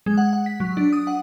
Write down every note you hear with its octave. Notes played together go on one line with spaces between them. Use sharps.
G#3
F#5
F#5
B6
F#3
D4
D#6
F#5